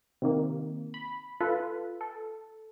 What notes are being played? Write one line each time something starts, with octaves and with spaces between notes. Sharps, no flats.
C3 D#3 A#3
B5
F4 A4 B4
A4